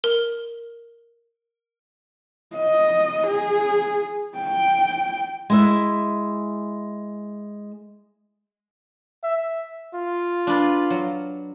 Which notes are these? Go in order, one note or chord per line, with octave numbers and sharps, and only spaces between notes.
A#4
D#5
G#4
G5
G#3 E4 E5
E5
F4
D4 B4
F#3